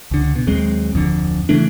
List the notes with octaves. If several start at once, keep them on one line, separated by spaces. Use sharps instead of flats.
C#2 D3
B2
D#2 F#3 G#3 C4
D1 F2 D3
C#3 E3 A3 D4